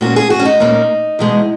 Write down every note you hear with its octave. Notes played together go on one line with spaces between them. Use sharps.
A#2 A#3 C#4 F#4
G#4
F#4
C#4
D#4
A#2 A#3 C#4
E2 B2 G#3